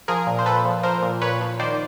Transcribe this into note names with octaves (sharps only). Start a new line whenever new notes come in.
F3 G#4 A#4
A#2
C5
A#2 A4 B4
F3
F3 A#4 C5
A#2
A#2 B4 C#5
F3
D#3 C5 D5